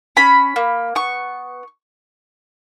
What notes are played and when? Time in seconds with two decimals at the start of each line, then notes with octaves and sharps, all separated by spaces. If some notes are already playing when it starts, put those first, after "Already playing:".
0.17 C#4 B5
0.56 A#3
0.95 B3 C#6